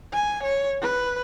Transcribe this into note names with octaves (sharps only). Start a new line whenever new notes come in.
G#5
C#5
B4